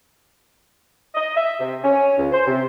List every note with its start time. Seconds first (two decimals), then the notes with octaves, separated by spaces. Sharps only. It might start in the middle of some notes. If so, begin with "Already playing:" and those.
1.15 D#5
1.36 E5
1.60 C3
1.84 C#4
2.18 C#2
2.32 C5
2.47 C3